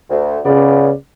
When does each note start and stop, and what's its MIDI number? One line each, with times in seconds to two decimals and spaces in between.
0.10 0.38 38
0.45 0.89 37
0.45 0.93 49
0.45 0.89 59
0.45 0.89 74